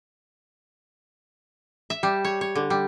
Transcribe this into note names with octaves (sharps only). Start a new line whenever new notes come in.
E5
G3
C#5
C#5
D3
G3